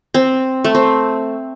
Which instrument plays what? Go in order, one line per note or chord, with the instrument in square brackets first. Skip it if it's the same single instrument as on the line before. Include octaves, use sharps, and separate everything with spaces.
[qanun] C4
A3
C4